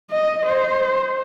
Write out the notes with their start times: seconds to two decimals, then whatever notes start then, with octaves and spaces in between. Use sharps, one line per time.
0.11 D#5
0.46 C5